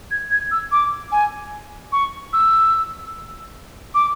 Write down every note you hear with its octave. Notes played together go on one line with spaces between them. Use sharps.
G#6
G#6
E6
D6
G#5
C#6
E6
D6